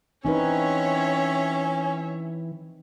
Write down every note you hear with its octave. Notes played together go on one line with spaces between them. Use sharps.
E3 C4 C#4 D#4 B4 C#5 E5